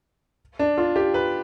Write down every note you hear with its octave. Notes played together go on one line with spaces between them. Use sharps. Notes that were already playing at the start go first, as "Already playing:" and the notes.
D4
F4
G4
B4